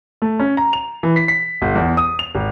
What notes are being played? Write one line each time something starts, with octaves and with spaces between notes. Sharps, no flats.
A3
C#4
A#5
F7
E3
B6
B6
G1
E2
D#6
F7
G#1